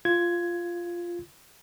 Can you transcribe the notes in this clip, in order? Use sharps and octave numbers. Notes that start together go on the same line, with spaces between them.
F4 G#6